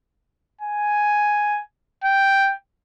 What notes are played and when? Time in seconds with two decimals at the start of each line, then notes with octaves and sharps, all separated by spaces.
0.61 G#5
2.04 G5